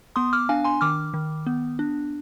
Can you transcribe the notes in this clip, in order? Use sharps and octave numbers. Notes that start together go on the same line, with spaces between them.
B3 C6 D#6
D6 F6
D4 F5 G#5
G#5 C6
D#3 D6 F6
D#3
B3
D4